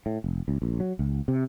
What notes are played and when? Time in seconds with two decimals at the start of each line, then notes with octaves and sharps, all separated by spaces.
0.06 A2
0.24 F1
0.48 C#2
0.62 A#1
0.80 F#3
0.99 C#2
1.28 C3